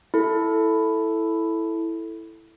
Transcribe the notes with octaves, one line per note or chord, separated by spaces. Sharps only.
E4 A4